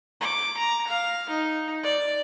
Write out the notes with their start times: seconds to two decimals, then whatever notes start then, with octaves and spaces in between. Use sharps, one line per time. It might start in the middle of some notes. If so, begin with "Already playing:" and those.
0.21 D6
0.57 A#5
0.87 F5
1.29 D#4
1.83 D5